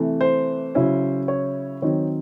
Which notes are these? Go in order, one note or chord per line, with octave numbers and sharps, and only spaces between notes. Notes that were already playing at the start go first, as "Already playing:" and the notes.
Already playing: C3 E3 A3
C5
C#3 F#3 C#4 E4
C#5
D#3 F#3 C4 D#4 C#5